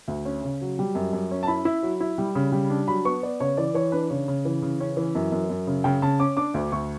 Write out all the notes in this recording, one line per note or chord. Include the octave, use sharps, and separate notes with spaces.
D2
C#4
C#3
F#3
G3
F#2
F#2
C#4
A5
E4 B5
E4
F#3
E4
G3
C#3
G3
D4
F#3 B5
B3 C#6
B3 D5
C#3 C#5
E3 D5
E3 C#5
D4 B4
C#3 C#5
C#3
E3
C#3
C#4
E3
F#2
F#2
F#2
C#3
C#3 G5
C#3 A5
C#4 D6
D4 D6
D2
D2 C#6